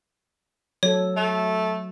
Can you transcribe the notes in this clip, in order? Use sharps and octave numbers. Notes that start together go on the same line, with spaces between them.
F#3 A4 C#5
A3